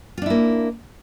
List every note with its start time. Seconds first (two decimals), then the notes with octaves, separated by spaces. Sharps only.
0.18 F4
0.22 D4
0.26 E4
0.30 A#3